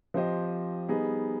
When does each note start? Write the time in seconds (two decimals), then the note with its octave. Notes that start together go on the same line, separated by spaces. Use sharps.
0.14 F3 C4 G4 C5 D#5
0.89 G3 B3 D#4 G#4